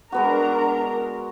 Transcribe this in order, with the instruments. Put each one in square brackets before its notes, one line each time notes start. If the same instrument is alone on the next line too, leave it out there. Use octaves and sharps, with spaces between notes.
[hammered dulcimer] G#3 B3 F#4 [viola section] D4 A#4 A#5